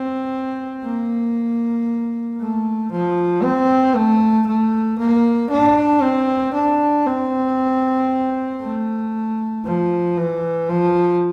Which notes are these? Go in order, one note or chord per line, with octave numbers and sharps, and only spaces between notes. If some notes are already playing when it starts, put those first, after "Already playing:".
Already playing: C4
A#3
A3
F3
C4
A3
A3
A#3
D4
C4
D4
C4
A3
F3
E3
F3